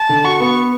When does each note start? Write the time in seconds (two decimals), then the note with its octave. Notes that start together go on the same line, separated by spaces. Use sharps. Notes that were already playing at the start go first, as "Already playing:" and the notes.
Already playing: A5
0.09 D3
0.24 F#4 C#6
0.40 B3